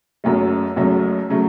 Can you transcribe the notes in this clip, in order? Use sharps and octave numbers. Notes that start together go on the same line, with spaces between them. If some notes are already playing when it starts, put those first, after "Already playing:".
F#1 F#2 C#3 F#3 A3
F#1 F#2 C#3 F#3 A3
C#3 F#3 A3